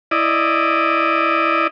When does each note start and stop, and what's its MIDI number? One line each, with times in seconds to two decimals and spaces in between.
0.11 1.67 64
0.11 1.67 74
0.11 1.67 75